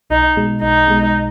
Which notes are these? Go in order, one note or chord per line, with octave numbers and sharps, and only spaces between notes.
B1 D#4
B2 G#3
B1 D#4
B2 G#3